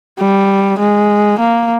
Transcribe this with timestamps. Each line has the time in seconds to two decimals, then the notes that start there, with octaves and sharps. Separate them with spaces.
0.20 G3
0.79 G#3
1.39 A#3